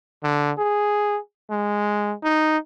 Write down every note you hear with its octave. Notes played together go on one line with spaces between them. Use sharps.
D3
G#4
G#3
D#4